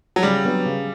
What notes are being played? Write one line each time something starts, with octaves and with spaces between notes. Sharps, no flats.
F#3
C#3 G3
F#3 B3 D4
C#3